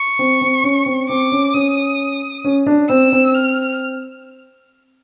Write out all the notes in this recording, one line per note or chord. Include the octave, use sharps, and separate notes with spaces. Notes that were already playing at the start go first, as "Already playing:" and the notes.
Already playing: C#6
C4
C4
C#4
C4
C4 D6
C#4
C#4 D#6
C#4
D4
C4 E6
C4
F6